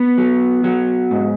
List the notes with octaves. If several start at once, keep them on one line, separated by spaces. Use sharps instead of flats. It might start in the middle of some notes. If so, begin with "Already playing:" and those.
Already playing: B3
F#3
F#3
G#2